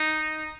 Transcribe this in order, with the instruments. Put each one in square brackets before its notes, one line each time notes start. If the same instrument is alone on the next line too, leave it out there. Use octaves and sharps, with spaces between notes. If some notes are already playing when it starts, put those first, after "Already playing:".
Already playing: [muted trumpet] D#4